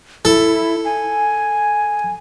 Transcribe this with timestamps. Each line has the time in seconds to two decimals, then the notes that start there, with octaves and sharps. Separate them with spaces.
0.25 E4 A4
0.85 G#5